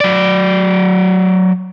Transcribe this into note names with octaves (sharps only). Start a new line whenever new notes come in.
F#3 D5